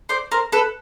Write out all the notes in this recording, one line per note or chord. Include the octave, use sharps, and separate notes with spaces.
C5 D5
A#4 C5
A4 B4